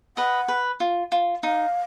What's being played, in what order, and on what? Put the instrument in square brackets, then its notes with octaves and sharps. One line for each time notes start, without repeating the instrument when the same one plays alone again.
[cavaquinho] B4 D#5 [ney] F#5
[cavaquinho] B4
F4
F4
[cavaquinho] D#4 [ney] F5